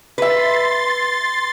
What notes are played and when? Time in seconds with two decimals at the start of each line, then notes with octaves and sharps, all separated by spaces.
0.18 B4 E5 C6 A6